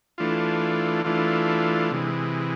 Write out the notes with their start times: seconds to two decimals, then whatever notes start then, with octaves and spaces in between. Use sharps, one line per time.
0.18 E3 A3 D4 F4
1.04 E3 A3 D4 F4
1.91 C3 E3 G#3